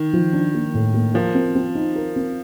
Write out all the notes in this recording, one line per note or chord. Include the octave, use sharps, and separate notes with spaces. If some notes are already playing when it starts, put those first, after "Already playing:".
Already playing: D#3
F3
D4
A#3
A2
A#3
F3 A#4
C4
C4
D#4
A#4
C4